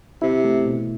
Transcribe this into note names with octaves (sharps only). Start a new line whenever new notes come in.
C3 E4
A3
B2